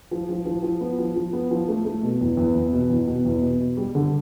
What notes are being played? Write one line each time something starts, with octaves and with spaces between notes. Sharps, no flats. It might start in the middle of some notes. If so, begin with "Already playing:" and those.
F3
F3
F3
F3
B3
F3
F3
B3
F3
A3
A3
B2
E2
E2
E2
B2
E2
B2
E2
B2
B2
G3
D3